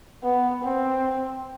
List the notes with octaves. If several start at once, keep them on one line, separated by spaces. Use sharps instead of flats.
B3
C4